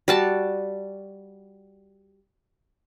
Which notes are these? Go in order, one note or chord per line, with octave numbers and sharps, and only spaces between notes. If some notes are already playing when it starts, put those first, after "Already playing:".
G3 F#4 A5